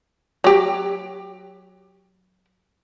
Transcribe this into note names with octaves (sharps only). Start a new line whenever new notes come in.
F#3 G4